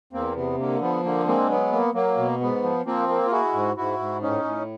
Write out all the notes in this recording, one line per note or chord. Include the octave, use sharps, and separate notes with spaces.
E2 A#3 C4
C3 B3
D3 A#3
F3 B3
D3 A#3
G#3 A#3 C4
F#3 B3
A#3
F#3 A#3
B2
G#2 B3
F3
F3 A#3 C4
A#3
F4
G#3 E4 F#4
G#2
G#2 E4 F#4
G#2
A2 C#4 D#4
A2